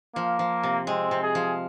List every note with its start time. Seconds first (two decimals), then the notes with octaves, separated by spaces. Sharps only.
0.16 F3 A#3
0.39 F3
0.63 C3
0.87 G#3 C4
1.11 C3
1.23 G#4
1.35 F3